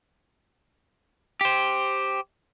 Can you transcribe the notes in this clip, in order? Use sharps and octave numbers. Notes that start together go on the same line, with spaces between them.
G4 C5